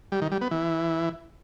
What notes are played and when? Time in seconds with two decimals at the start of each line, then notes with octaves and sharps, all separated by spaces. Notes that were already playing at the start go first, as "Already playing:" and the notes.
0.12 G3
0.22 D#3
0.32 G3
0.41 B3
0.51 E3